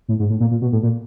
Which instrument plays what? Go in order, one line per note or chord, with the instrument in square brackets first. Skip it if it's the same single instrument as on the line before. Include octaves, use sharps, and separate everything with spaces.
[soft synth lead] A2
G#2
A2
A#2
A#2
B2
A2
A#2